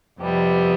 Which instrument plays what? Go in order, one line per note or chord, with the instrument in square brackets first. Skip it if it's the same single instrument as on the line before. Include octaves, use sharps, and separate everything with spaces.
[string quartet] F2 C3 G3 B3